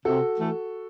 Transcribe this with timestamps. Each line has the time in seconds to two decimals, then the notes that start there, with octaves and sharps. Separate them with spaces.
0.05 C3 F#4 A4
0.38 E3 A3